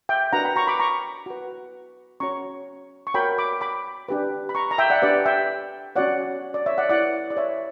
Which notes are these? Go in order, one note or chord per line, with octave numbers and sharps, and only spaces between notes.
E5 G5
D4 F#4 B4 F#5 A#5
G5 B5
A#5 C#6
B5 D6
A#5 C#6
F#4 B4
C#4 F#4 C#5 A#5 C#6
C#6
F#4 A#4 C#5 G5 B5
B5 D6
B5 D6
D4 G4 B4
B5
A#5 C#6
A#5
E5 G5
D5 F#5
E5
D4 G4 B4 D5 F#5
E5 G5
C#4 F#4 C#5 D5 F#5
D5
C#5 E5
D5 F#5
E4 B4 D5 F#5
D5
C#5 E5